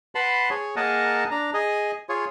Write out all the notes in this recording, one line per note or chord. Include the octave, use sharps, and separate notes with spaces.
B4 F#5 A5 B5 C6
G#4 C#5
A#3 G#4 A#4 D#5 F#5 A5
D4 A#5
G#4 D#5
F4 G#4 C#5